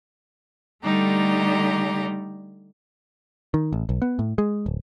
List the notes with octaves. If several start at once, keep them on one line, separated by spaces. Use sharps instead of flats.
D3 G3 A3 D#4 G4 A#5
D#3
A1
B1
B3
A2
G#3
D1